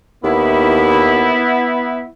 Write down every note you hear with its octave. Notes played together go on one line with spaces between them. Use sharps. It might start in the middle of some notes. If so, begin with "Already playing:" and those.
D#2 B3 E4